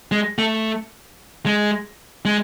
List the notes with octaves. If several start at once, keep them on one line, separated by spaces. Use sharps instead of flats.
G#3
A3
G#3
G#3